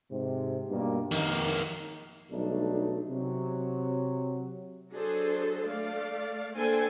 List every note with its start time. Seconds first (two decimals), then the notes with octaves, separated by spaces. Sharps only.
0.11 G#2 C3
0.70 G2 B2 A#3
1.12 F2 D#3 A#3 D#4
2.31 B1 B2 G3 A3 D4 D#4
3.09 C3 F#3
4.92 F#3 D4 G#4 A4 C5
5.66 A3 D5 F5
6.56 A#3 D4 A4 C5 G5 G#5